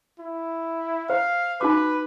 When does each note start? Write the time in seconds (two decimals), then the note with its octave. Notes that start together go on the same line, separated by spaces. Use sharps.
0.20 E4
1.10 C5 F5
1.61 D#4 F#4 B4 D6